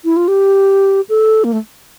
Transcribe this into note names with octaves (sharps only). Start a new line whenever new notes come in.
E4
F4
G4
A4
A#3
A3